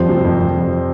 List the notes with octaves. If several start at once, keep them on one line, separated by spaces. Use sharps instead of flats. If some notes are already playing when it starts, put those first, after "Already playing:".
Already playing: F2 F3 G3 C5
C3
F2
F2
F3